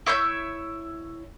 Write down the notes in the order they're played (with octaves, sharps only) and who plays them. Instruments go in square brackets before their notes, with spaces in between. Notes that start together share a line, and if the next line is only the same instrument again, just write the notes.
[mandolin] E4 C#5 E5 G6